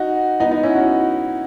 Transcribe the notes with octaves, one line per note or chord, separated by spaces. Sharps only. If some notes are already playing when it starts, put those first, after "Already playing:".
Already playing: D#4 F#4
B3 D#4
B3 D#4
C#4 E4
D#4 F#4